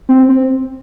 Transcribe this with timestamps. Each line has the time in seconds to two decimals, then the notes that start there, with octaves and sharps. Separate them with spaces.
0.09 C4
0.29 C4